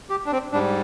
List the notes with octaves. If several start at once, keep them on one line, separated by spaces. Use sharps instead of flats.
G4
D4
C4
G#2 G3 D4